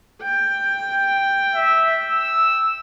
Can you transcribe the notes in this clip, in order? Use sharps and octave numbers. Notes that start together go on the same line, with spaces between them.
G5
E5
E6